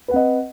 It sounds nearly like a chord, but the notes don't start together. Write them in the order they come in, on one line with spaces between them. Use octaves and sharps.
B4 F#5 C4 D#5